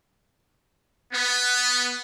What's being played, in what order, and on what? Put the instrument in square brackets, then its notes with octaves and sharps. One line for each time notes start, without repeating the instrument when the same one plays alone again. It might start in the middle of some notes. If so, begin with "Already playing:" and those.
[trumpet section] B3